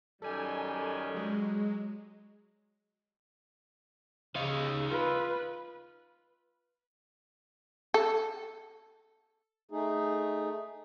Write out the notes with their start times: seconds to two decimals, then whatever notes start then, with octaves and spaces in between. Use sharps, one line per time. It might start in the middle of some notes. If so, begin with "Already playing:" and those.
0.22 F#2 D#3 G3 A4 G#5
1.14 F#3 G#3
4.36 C#3 D#4 F5
4.91 F4 B4
7.94 A4
9.71 A3 D#4 G#4